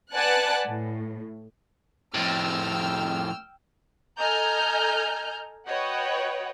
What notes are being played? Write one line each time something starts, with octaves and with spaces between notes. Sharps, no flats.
B4 D5 F#5 G#5 A5 F#6
A2
F2 A2 G5 E6 F6
A4 D#5 G#5 A#5 F6 G6
F#4 B4 C#5 D#5 F#5 G5